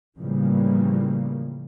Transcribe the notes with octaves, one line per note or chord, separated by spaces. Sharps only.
A2 C#3 E3 F3 G3 A#3